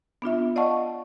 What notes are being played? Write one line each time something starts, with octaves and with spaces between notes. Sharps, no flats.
B3 D4 F4 E5
D5 D#5 F5 F#5 A5 C#6